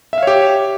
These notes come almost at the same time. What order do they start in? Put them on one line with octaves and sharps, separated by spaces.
E5 F5 C#5 G4